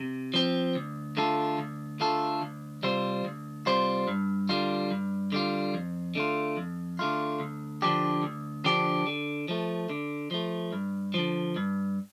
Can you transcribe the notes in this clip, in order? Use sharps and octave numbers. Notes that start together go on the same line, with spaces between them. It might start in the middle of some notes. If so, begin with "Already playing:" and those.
Already playing: C3
F3 C4
D2
D3 A3 F4 A4
D2
D3 A3 F4 A4
D2
C3 G3 F4 C5
D2
C3 G3 F4 C5
G2
D3 G3 F4
G2
D3 G3 F4
F2
D3 A3 F4
F2
D3 A3 F4
D2
D3 F3 D4 G4
D2
D3 F3 D4 G4
D3
F3 A3
D3
F3 A3
G2
D3 F3
G2